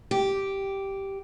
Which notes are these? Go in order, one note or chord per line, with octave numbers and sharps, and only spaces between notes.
G4